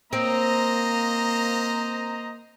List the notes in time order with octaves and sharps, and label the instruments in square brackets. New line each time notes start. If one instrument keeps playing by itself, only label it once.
[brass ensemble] A#3 [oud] C4 [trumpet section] C5 D#5 A#5